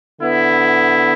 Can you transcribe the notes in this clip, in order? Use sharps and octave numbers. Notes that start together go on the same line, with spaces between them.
D3 B3 E4